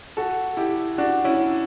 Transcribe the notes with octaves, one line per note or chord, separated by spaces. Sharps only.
F#4 A4
E4 G4
D4 F#4
C#4 E4